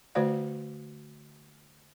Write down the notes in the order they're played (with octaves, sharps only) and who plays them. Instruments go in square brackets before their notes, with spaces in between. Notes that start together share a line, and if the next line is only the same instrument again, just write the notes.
[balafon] D3 A3 F#4 C5 D5 F5